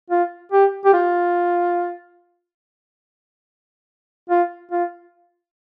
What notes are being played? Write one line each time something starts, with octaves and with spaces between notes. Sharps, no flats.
F4
G4
G4
F4
F4
F4